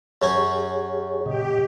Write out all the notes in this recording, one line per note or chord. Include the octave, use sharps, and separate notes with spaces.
F#2 C#4 G4 G#4 C#5 G#5
A#2 C#3 G4 D#5